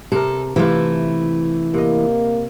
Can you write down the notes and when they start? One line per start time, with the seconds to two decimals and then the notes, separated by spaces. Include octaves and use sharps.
0.12 C3 A4 A#4
0.56 C3 E3 A3 E4 F4
1.74 C3 A#3 D#5